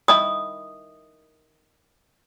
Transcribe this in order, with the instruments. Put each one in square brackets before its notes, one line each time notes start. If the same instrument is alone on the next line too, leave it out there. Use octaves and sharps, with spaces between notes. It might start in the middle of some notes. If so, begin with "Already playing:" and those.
[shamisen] D#3 E4 B5 [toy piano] D#6